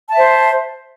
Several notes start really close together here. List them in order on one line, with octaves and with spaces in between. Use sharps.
A5 E5 C5